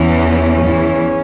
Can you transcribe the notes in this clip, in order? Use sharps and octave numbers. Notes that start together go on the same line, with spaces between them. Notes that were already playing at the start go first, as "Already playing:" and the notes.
Already playing: E2 E3 C#4
E2 E3